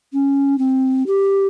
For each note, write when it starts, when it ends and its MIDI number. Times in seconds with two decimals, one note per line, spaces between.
0.13 0.58 61
0.58 1.03 60
1.07 1.47 67